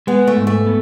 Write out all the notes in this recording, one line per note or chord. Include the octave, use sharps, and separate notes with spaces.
G#3 B3
A3
G#2
A3
B3